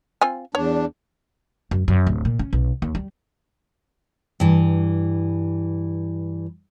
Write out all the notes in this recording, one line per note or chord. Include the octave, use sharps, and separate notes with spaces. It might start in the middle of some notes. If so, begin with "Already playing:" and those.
C4 F4 G#5
E2 D4 C#5
F#2
F#2
D1
A#2
C#4
B1
D#2
G3
G2 E3